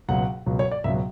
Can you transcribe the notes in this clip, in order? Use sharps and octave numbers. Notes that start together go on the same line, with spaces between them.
C#2 B2 F#3 F#5
C#2 B2 F#3
C#5
D5
C#2 B2 F#3 E5